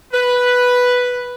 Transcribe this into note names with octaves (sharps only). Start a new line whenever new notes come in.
B4